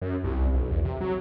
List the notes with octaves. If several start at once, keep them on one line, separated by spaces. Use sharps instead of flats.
F#2
C2
B1
E2
C3
F#3